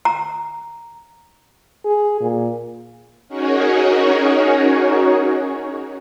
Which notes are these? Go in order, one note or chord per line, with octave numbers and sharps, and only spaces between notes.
A#5
G#4
A#2
C#4 D#4 F#4 G#4 A#4 C#5